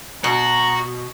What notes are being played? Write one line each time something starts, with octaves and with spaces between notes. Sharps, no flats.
B2 F#4 A#5